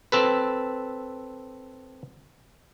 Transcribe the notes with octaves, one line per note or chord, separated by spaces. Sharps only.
C4 A4 B4